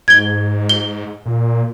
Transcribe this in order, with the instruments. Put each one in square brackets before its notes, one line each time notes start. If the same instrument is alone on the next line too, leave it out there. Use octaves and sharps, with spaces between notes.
[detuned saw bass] G#2 [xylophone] G#6 G7
[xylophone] G7
[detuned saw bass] A#2